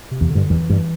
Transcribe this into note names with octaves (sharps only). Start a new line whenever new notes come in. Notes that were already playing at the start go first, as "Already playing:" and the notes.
C3
E2
D3
G2
E2 E3
G2